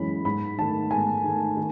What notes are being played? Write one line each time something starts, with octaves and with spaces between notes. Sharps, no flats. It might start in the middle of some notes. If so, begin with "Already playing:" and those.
Already playing: F#2 E3 G#3 C#4 B5
G#2 B5
D#3 A3 A5
G#2 G#5
D#3 A3
D#3